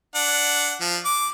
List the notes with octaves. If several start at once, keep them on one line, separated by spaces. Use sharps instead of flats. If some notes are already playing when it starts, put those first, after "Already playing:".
D4 F#5
F3
D6